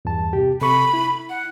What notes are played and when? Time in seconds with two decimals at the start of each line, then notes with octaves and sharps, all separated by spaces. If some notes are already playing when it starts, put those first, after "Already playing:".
0.05 E2 G2 A5
0.33 C3 G4
0.61 C3 A4 B5 C#6
0.94 E4
1.29 F#5